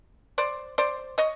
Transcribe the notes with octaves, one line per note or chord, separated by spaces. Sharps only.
C5 D5
C5 D5
C#5 D#5